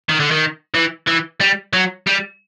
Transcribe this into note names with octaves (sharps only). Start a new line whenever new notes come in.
D#3
D3
D#3
E3
E3
G3
F#3
G3